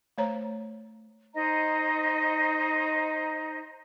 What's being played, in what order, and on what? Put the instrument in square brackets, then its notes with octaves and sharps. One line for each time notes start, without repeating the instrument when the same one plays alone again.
[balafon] A3 C5 C#5 A#5
[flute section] D#4 C5 D#5 A#5